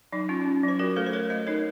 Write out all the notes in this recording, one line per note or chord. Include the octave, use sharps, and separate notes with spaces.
F#3 D#4
C#4 F4
C#4
F#3
C5
F#3 F#4 A#4
A3 A4 C5
C5
A3 A#4 C#5
A3 C5 D#5
D#4 A#4 C#5